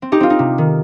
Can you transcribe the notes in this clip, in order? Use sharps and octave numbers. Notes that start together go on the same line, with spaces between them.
C4
D#4 G4
C4 F4
D#4
C3
D#3